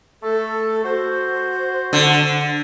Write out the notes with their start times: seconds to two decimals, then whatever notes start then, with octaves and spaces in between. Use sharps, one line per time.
0.23 A3 A4
0.84 F#4 C5
1.93 D3